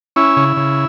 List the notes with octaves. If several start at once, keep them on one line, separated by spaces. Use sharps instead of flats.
C#4 E4
C#3
C#3